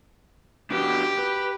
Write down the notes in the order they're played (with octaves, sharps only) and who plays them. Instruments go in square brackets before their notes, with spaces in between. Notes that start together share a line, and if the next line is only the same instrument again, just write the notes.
[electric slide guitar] D4 F#4 B4 [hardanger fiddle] G4
[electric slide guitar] B4